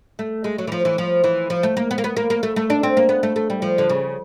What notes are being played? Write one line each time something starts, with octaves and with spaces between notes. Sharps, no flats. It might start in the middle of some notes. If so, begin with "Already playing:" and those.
A3
G#3
F#3
E3
F3
E3
F3
E3
F3
A3
A#3
B3
A#3
B3
A#3
A#3
A3
A3
D4
C4
A#3
B3
A3
A3
G3
F3
D3
C#3